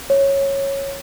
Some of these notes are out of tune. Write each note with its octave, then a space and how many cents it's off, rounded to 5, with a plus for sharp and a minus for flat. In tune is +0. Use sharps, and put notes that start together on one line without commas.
C#5 -10